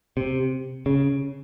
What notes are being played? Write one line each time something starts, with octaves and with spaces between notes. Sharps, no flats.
C3
C#3